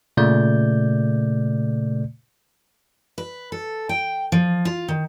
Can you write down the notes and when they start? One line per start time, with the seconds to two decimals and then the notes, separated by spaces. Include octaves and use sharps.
0.17 A#2 C#3 A3 D5 G6
3.18 B4
3.52 A4
3.89 G5
4.32 F3
4.65 F4
4.88 D#3